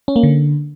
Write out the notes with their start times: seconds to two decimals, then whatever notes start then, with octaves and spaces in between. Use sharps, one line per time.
0.08 C#4
0.16 A#3
0.23 D3